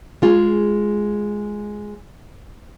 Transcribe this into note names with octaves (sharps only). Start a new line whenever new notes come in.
G#3 F4 G#4